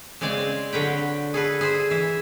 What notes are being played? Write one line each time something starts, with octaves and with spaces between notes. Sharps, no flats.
C#3 G#3 C4 D5 G#5
C4
D3 F#3 B4 G5
G#4 A4 B4
G#4 C5 E5
E3 E5